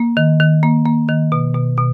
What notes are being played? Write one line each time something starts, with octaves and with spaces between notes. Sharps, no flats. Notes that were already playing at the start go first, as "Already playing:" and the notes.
Already playing: A#3
D#3
D#3
A#3
A#3
D#3
B2
B2
B2